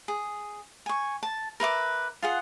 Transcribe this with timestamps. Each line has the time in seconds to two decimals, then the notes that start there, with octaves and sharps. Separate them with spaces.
0.08 G#4
0.86 G#5 C#6
1.23 A5
1.60 A#4 B4 E5 D6
2.22 F4 G#4 F#5